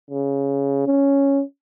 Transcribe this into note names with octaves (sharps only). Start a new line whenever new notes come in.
C#3
C#4